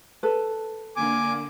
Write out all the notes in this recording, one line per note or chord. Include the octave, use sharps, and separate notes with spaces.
A4 B4
D3 A#3 G#5 D6